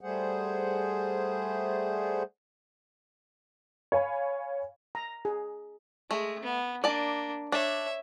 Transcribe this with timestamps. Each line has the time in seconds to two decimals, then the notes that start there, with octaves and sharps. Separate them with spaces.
0.01 G3 A3 G#4 C5 F#5
3.92 C#5 F5 G#5 B5
4.95 A#5
5.25 G#4
6.11 G#3 A3
6.43 B3
6.84 A#3 D4 D5 A5
7.52 D4 C#5 E5